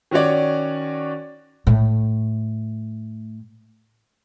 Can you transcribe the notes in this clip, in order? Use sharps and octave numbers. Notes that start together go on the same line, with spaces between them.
D#3 C#4 F#4 C#5 D5
A2 A3